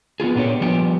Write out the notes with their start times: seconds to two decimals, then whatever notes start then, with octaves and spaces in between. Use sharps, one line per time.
0.20 B3 C#4 F4 G#4
0.35 A#2 A#3 B3 D4 G4 C#5
0.61 F3 G3 B3 G4